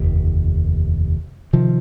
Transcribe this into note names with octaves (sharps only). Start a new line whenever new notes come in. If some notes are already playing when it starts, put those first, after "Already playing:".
Already playing: F1 D#2
C3 D#3 F3